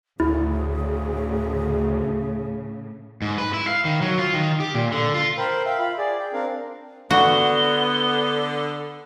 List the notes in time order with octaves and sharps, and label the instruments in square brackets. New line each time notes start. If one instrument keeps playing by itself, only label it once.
[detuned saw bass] D2 [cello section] A2 C#3 [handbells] E4 [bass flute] G#4
[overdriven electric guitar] G#2
B4
E4
F5
D#3
F#3
F4
D#3
G4
A#2
D3
F4
[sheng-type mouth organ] A#4 C5 G5 B5
E5 F5 G5
F4 B5
G#4 D5
G5
C4 D4 A#4 F5
[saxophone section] D3 [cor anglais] B3 [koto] F#4 [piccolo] G7